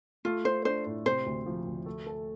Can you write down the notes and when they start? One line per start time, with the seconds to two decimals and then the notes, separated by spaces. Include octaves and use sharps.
0.25 A3 F4
0.45 F4 C5
0.65 D4 C5
0.86 A2
1.06 C3 C5
1.26 D2
1.46 F3
1.66 D2
1.86 A3
2.07 A4